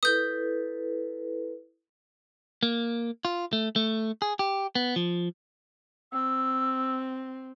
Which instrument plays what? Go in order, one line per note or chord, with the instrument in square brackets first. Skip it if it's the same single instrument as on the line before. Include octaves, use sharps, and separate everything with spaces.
[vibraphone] E4 A4 B4 [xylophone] D#6 G6
[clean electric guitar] A#3
F4
A3
A3
G#4
G4
B3
F3
[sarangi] C4 [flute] E6